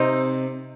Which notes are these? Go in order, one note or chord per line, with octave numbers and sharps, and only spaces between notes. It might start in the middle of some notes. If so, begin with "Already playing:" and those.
Already playing: C3 C4 D#4